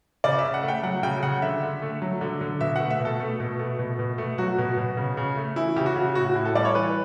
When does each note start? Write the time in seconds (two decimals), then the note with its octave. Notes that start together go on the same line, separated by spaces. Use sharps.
0.24 C#3 D5
0.39 E5
0.44 C#3
0.54 F#5
0.63 A3
0.68 G5
0.83 F#3 F#5
1.03 C#3 G5
1.23 C#3 F#5
1.42 D3 E5
1.62 D3
1.82 A3
2.02 F#3
2.21 D3
2.41 D3
2.60 B2 E5
2.76 A3 F#5
2.90 E5
3.00 B2 A4
3.20 A3
3.40 B2
3.59 A3
3.79 B2
3.99 B2
4.18 A3
4.38 F#3 F#4
4.58 B2
4.77 B2
4.97 C#3
5.17 C#3
5.37 A3
5.56 E3 E4
5.76 C#3 G4
5.86 F#4
5.96 C#3
6.15 A2 F#4
6.35 A2
6.45 A4
6.55 G3 D5
6.65 C#5
6.75 E3 B4